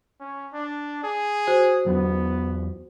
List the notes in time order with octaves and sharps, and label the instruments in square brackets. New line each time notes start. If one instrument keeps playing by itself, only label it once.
[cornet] C#4
D4
G#4
[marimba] F#4 C5
[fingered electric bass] E2 F#3 [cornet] B3